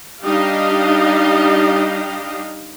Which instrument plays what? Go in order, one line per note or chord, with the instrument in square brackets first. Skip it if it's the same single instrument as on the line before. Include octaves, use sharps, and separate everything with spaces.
[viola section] G3 D4 D#4 G4 D#5 F5